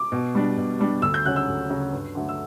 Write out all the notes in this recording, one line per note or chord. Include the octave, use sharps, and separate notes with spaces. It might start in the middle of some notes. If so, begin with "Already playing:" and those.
Already playing: D6
B2
G3 D4
B2
G3 D4
D2 E6
G6
C#3 F#3 C#4 F#6
E6
D2
C#3 F#3 C#4
G2
D3 F#3 A3
E6